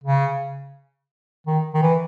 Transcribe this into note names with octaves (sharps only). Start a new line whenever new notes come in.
C#3
D#3
D#3
E3